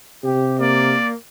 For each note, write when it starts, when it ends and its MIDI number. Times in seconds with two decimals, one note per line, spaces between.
0.23 0.95 48
0.23 0.59 67
0.59 1.14 58
0.59 1.10 74